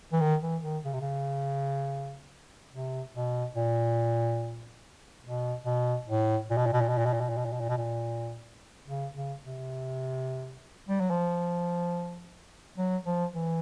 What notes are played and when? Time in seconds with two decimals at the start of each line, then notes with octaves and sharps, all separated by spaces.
0.12 E3
0.21 D#3
0.42 E3
0.63 D#3
0.85 C#3
0.93 C3
1.01 C#3
2.72 C3
3.15 B2
3.56 A#2
5.24 B2
5.65 B2
6.08 A2
6.50 A#2
6.57 B2
6.66 A#2
6.73 B2
6.81 A#2
6.89 B2
6.98 A#2
7.06 B2
7.13 A#2
7.20 B2
7.29 A#2
7.37 B2
7.45 A#2
7.53 B2
7.60 A#2
7.69 B2
7.77 A#2
8.87 C#3
9.14 C#3
9.43 C3
10.88 G3
11.00 F#3
11.10 F3
12.78 F#3
13.06 F3
13.33 E3